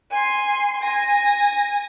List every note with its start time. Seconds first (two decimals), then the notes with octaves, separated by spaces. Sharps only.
0.11 G#5 C6
0.80 G#5 A#6